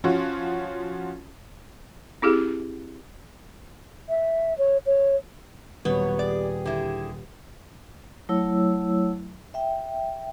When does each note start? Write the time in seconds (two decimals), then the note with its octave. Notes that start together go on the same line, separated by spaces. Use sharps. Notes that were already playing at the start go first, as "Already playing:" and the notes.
0.04 F3 C#4 F4 F#4
2.22 C4 E4 G4 G#4
4.09 E5
4.58 C#5
4.86 C#5
5.85 D#1 B2 F#3 B3 C#5
6.19 G4 G#4 D5
6.66 D3 E4
8.29 F#3 A3 E4 C#5 E6
9.54 E5 G5